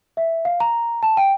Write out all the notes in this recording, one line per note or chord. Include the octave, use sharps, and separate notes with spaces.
E5
F5
A#5
A5
G5